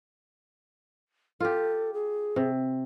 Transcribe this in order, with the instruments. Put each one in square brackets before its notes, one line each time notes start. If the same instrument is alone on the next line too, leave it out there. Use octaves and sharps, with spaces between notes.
[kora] F4 G4 [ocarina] A4
[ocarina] G#4
[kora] C3